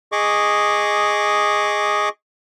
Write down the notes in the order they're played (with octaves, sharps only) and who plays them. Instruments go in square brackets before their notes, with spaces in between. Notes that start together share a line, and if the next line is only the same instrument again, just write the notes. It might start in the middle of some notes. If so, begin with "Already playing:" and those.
[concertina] G#4 D#5 C#6 D6